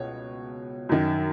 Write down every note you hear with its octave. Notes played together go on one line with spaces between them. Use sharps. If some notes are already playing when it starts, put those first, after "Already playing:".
Already playing: C#2 B2 C#5
F#2 D#3